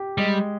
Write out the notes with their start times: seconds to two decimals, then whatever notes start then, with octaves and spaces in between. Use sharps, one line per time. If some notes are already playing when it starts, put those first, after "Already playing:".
Already playing: G4
0.18 G3 G#3